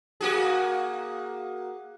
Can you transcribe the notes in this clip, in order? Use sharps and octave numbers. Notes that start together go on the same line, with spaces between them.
A#3 F#4 G#4